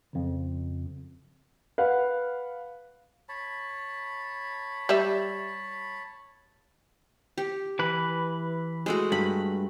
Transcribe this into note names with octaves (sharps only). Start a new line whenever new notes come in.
F2 C#3
B4 F5 F#5
C#5 A5 B5
G3 E5
G4
E3 B4
G#3 A3 F#4
G2 B5